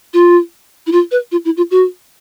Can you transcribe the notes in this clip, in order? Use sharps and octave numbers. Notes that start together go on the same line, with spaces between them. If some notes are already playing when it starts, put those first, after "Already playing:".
F4
E4
F4
B4
F4
E4
F4
F#4